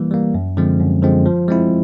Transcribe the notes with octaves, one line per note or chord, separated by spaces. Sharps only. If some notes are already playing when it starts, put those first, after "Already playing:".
Already playing: E3 G3 A#3
G3 A#3
F#2
D3 F3 G#3 C4
F#2
D3 F3 G#3 C4
F3
G#3 C4 E4